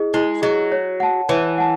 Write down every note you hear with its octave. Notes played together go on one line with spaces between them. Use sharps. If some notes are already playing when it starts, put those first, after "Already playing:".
Already playing: E4 G#4 D#5
G#3 E4
F#3 G#4 D#5
C#5
F#5 A5
E3 C#5
F#5 A5